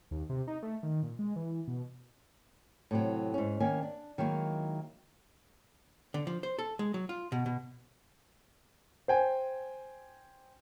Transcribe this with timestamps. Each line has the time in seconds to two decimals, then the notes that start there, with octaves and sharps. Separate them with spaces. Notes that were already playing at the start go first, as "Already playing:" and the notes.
0.11 D#2
0.30 C3
0.48 D#4
0.63 A3
0.83 D#3
1.03 A#2
1.19 G#3
1.36 E3
1.68 B2
2.91 A2 C3 F#3
3.34 G#2 C#4
3.60 D#3 A#3 C#4 G#5
3.83 D4
4.18 D#3 F#3 G#3 A#3 E4
6.14 D3
6.27 F3
6.43 C5
6.59 A4
6.79 G#3
6.94 F#3
7.09 F4
7.32 B2
7.46 B2
9.08 C5 G5 G#5